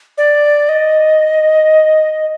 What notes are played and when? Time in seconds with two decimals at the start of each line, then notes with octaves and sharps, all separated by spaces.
0.18 D5
0.69 D#5